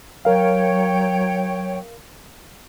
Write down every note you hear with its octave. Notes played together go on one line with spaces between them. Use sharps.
F#3 A#4 C#5 F5 G5